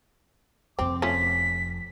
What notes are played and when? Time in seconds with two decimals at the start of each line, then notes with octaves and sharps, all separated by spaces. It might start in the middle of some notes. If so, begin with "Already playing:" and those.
0.79 F1 F2 C4 D6
1.02 F3 A3 C#4 B6